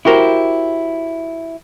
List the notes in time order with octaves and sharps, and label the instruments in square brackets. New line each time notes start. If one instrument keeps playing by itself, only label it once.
[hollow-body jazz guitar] E4 F#4 G4 A#4 C5